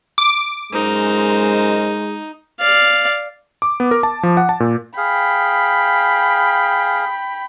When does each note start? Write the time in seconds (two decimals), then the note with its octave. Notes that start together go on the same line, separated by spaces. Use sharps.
0.18 D6
0.73 F#2 G#3 D#4 A#4 C5
2.60 D5 F5
3.62 D6
3.80 B3
3.91 A#4
4.03 A5
4.23 F3
4.37 F#5
4.49 A5
4.60 A#2
4.97 G#4 F5 G5 B5